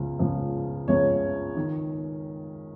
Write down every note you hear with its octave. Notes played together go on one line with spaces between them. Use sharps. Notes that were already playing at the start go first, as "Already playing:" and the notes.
Already playing: C#2 C#3 F3
C#2 C#3 F3
C#2 C#3 F3 C#5
D#3